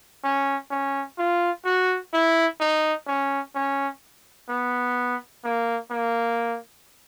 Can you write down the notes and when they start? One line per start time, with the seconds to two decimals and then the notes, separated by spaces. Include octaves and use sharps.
0.24 C#4
0.71 C#4
1.18 F4
1.66 F#4
2.14 E4
2.60 D#4
3.07 C#4
3.55 C#4
4.50 B3
5.44 A#3
5.91 A#3